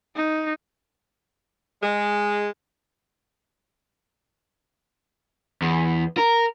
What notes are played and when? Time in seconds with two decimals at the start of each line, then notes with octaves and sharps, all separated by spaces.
0.16 D#4
1.82 G#3
5.62 E2
6.17 A#4